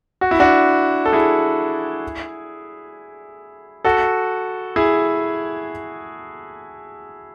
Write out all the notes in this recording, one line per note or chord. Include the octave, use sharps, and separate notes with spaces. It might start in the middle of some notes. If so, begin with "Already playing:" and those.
F#4
E4
D4 F#4
A4
E4 G#4
F#4 A4
E4 G#4